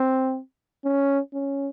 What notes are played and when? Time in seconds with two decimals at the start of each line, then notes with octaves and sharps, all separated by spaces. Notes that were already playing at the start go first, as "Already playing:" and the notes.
Already playing: C4
0.85 C#4
1.34 C#4